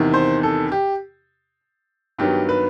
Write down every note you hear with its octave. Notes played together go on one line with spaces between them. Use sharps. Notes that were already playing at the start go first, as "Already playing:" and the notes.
Already playing: E2 C3 D#3
C5
A4
G4
G2 D#3 F#3 B3 G4
B4